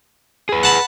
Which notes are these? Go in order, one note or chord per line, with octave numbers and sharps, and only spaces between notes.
G#4 B4
F#5 A5 B5